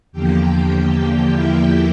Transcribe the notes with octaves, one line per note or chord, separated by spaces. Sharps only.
E2 D3 F3 A#3 G4 G5
G4 G5
E4 E5